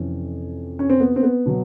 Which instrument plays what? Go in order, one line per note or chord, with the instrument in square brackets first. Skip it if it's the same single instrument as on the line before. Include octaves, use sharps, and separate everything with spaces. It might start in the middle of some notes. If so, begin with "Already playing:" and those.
Already playing: [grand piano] F2 C3 E3 C#4
C#4
C4
B3
C4
B3
B2 F#3